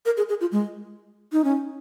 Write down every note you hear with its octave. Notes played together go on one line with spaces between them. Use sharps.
A#4
G#4
G#4
F4
G#3
D#4
C#4